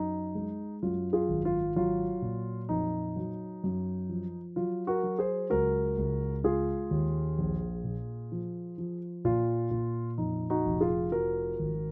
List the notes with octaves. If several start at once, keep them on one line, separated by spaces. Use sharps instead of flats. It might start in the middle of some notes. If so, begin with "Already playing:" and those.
Already playing: F#2 D#4
G#3
F#2 F4
F4 G#4
G#1
F4
F#3 F4
A#2
F2 D#4
F#3
F#2
F3
F#3 F4
F#4 A#4
F#3
G#4 C5
C#2 F#4 A#4
C#2
G#3 F4 G#4
D#2
A#1
A#2
F3
F3
A#2 F4
A#2
F2 D#4
D#4 F#4
F1
F4 G#4
F3 F#4 A#4
G#1